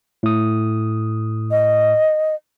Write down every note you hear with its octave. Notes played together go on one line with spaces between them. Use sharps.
A2 D#6
D#5